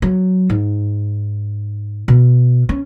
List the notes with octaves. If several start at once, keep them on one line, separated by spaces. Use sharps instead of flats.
F#3
G#2
B2
C#4